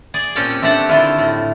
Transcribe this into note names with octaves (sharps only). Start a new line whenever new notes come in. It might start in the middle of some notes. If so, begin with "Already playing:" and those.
G#4 D5
A#2 C4 C#4 G4 G5 A5
A3 C4 D4 G4 F#5 A5
D3 D#3 A3 E4 F4
A2